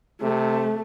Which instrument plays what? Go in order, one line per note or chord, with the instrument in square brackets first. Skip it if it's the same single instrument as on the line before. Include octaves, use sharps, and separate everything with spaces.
[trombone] C3 [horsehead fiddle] A3